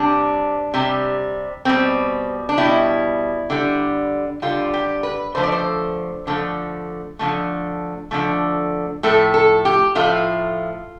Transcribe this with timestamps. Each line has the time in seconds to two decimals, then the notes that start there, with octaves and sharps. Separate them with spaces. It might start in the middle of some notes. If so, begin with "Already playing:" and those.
Already playing: C3 G3 D4
0.74 C3 G3
1.65 B2 G3 C4
2.49 D4
2.58 B2 G3 E4
3.50 D3 G3
4.42 D3 G3 F4
4.73 G4
5.03 B4
5.35 D3 F3 A3 C5
5.43 D5
5.52 C5
6.27 D3 F3 A3
7.19 D3 F3 A3
8.11 D3 F3 A3
9.03 A2 F3 A3 A4
9.34 A4
9.65 G4
9.95 A2 F3 A3 F4